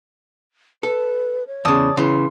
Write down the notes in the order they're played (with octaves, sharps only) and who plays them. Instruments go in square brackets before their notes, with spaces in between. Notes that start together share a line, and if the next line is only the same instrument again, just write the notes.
[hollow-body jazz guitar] A4 [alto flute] B4
[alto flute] C#5
[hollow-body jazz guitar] E2 C#3 [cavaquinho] D5 A5 D#6
[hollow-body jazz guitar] C#3 E3 [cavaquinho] C6